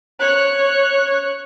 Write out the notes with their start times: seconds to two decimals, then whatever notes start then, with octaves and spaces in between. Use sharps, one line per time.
0.20 C#5 F#6